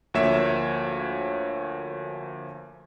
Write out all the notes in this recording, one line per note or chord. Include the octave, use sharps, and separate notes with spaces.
D2 F3 A#3 C#5 E5 E7